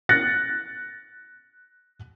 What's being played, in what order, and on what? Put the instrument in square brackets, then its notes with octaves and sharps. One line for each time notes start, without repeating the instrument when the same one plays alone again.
[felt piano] F#6 A6 A#6 C#7